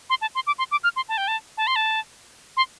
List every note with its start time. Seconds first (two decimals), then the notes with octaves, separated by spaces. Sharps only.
0.10 C6
0.22 A5
0.35 C6
0.47 D6
0.58 C6
0.71 D6
0.84 F6
0.96 C6
1.09 A5
1.18 G5
1.28 A5
1.57 A5
1.67 C6
1.76 A5
2.57 C6